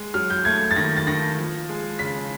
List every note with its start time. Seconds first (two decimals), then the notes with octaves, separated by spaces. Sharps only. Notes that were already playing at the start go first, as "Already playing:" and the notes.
Already playing: G#3
0.14 F#3 F6
0.30 G6
0.45 A3 G#6
0.71 A6
0.76 D#3 A#6
0.97 A6
1.07 D#3 A#6
1.38 F3
1.69 G#3
1.99 C#3 B6